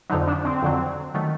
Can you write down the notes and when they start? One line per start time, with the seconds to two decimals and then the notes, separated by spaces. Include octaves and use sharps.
0.10 F2 D3 F#3 D#4
0.27 D4
0.45 C4
0.62 F2 D3 F#3
1.14 D#3 F#3 A3